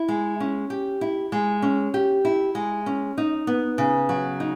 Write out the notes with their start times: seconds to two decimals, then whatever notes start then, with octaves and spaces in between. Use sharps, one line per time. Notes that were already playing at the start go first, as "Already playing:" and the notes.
Already playing: E4
0.08 G#3
0.40 C#4
0.70 G4
1.01 E4
1.32 G#3
1.62 C#4
1.94 G4
2.25 E4
2.55 G#3
2.86 C#4
3.18 D#4
3.47 B3
3.78 C#3
4.09 F#3
4.40 D#4